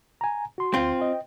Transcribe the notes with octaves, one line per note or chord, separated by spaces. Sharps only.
G#5 A#5
F#4 C6
D2 C4 F4 C6
D#5 G5